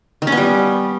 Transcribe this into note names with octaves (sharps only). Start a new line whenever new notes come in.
D#3
C#4
B3
G3